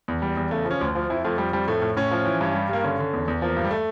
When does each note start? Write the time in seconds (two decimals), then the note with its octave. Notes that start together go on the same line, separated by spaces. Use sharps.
0.08 E2
0.22 G3
0.37 E2
0.51 C#3 A3
0.65 F3
0.71 C#4
0.81 D2
0.95 F3
1.10 F2 E4
1.24 F2 A3
1.38 F2 G3
1.53 F2 G3
1.68 A2 A3
1.82 A2
1.96 A2 C#4
2.11 F3
2.26 E3
2.41 G2
2.54 G3
2.69 G2 A#3
2.84 D3 C#4
2.99 D3
3.13 E2
3.28 E2
3.42 F3 A#3
3.56 G2
3.65 G3
3.71 A3